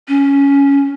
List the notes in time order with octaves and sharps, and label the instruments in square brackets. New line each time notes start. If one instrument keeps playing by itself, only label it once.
[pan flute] C#4